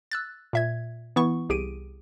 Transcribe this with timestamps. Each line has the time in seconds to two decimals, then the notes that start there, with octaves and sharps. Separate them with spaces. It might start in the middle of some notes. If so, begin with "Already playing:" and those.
0.12 E6 F#6 A6
0.53 A#2 E5 G#6
1.16 E3 B3 E4 C#6
1.50 C2 G4 G#4 D7 D#7